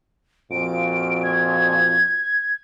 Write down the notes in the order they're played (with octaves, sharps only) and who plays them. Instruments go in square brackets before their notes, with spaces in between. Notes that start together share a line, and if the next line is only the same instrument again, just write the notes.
[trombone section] F2 A#2 F#4 [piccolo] D7
[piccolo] G#6